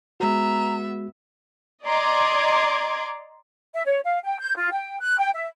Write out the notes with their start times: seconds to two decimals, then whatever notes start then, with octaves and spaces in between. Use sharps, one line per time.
0.20 G#3 B3 F#4 E5 A#5
1.85 D5 D#5 A#5 C6 D6 G#6
3.74 E5
3.86 C#5
4.04 F5
4.24 G5
4.39 G6
4.56 F4
4.72 G5
5.00 F#6
5.18 G5
5.34 E5